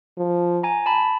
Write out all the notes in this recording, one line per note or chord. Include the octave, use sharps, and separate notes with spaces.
F3
G#5 A#5
A5 B5